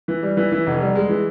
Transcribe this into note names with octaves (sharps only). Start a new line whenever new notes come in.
E3
G3
E3
E3
F1
G3
G#3
E3